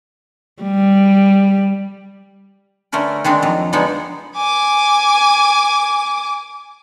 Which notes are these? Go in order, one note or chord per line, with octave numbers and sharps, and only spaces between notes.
G3
D3 A3 C#4 A#4 B4
D#3 G#3 C4 D4
F2 F#3 A#5
D3 F3 G#3 B3 D#4 C#5
G#5 D6